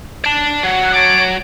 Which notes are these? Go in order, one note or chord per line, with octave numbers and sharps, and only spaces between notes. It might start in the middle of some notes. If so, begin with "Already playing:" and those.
D5 A5
F#3 F#5
C#5 A5 D6